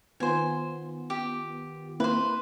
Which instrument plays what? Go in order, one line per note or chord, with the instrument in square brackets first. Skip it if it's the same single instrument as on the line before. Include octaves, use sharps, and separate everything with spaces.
[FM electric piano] D#3 B3 F4 [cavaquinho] C5 G#5
[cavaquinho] G4
[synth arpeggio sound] A#3 C4 E4 [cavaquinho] B4 C5